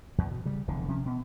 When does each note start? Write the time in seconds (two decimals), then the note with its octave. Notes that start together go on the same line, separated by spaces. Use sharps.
0.18 E2
0.31 B2
0.45 C#3 G3
0.68 F1 E2 D3
0.88 C3 F3 C#4
1.06 B2 B3